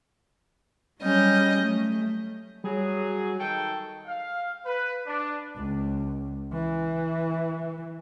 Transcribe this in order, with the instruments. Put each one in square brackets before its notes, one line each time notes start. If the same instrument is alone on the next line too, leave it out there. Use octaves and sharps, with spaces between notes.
[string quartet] F#3 G3 C#4 D#5 G6
A3
[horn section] F#3 G#4 [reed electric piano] G3
[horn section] D#3 A4 G5
[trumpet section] F5
B4
D4
[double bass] C#2
E3